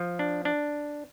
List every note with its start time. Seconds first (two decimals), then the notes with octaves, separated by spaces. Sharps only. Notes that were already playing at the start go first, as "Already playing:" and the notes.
Already playing: F3
0.19 D4
0.45 D4